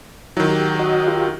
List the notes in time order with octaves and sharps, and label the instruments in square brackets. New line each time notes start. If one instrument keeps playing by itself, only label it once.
[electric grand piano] D#3 F#3 [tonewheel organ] E4
[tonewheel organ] G4
F#4 D#5
F4 G4